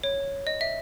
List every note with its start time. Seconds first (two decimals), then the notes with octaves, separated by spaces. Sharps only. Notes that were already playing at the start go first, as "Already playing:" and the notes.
0.04 C#5
0.47 D#5
0.61 E5